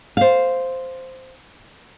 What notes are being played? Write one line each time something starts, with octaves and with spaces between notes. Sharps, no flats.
C5 F5